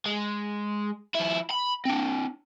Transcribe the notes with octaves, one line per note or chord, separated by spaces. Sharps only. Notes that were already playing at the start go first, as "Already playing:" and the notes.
G#3
F3 E4
B5
C4 D4